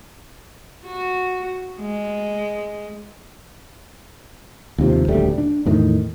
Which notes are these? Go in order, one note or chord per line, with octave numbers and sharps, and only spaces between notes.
F#4
G#3
D#2 G#2 C3 F3
D#1 D2 G3 A3
D4
E2 A2 D#3